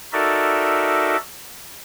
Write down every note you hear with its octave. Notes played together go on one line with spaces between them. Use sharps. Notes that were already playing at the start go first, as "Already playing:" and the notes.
D#4 F#4 A4 A#4 D5 E5